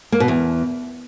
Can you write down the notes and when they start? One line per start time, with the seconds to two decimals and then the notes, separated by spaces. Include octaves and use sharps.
0.12 A#3
0.20 B2
0.28 E2